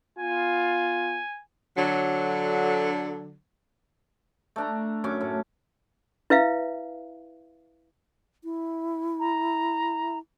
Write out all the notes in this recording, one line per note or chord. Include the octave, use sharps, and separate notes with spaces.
B3 F4 G#5
D3 F#3
A3 D4 A#5
F#2 C#4 C#6 D6
A2
E4 B4 E5 F5
E4
A#5